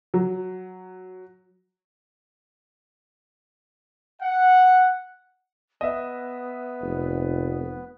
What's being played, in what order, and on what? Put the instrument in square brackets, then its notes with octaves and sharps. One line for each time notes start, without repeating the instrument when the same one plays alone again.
[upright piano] F#3
[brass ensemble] F#5
[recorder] B3 [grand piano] D#5 E5
[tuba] F1